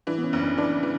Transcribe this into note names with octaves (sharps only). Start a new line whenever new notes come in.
E3 D4
B3
C#4
F#1
D4
E3 D4
E3